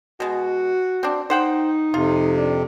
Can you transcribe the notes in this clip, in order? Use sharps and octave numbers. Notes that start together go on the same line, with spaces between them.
B2 G#3 F#4
C4 D4
D#4 C5 F#5 G5
F2 C3 F4
D4